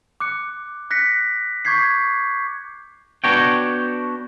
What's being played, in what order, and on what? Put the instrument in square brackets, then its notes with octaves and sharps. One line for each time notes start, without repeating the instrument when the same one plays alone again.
[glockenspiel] D6 F#6 C#7
F#6 A#6 B6 C#7
C#6 D6 G6 G#6 B6 C7
[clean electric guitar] B3 D4 F#4 C#5 G5